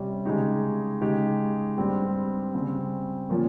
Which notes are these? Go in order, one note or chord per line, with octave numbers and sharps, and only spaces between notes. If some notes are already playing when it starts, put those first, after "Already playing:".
Already playing: C3 G3 C#4
C#3 G#3 D#4 G4
C#3 G#3 D#4 G4
G2 G3 C4 G4
C#3 G3 C4
A#2 F3 A#3 C#4